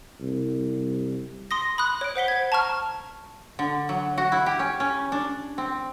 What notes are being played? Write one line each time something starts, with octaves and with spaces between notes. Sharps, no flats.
C2
C6 D#6 A#6
B5 D#6 F#6
C#5 D7
C5 F#5 B6 G7
C5 G#6
A5 A#5 C#6 F6
D3
F#3
F#4
E4
G4
C#4
C#4
D4
C4